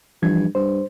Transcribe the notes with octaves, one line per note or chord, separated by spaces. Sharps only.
G2 E3 F3 G#6
G2 C5